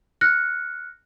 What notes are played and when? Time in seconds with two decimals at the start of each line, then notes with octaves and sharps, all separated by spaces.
0.21 F6 F#6 A#6 C#7